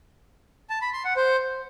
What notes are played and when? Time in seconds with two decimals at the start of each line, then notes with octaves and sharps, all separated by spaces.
0.70 A5
0.81 B5
0.93 C6
1.05 F#5
1.17 C5